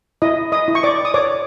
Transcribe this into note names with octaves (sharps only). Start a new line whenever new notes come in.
E4 D#5 D#6
D#5 D#6
E4
C#6
D5 D6
D#6
C#5 D5 D6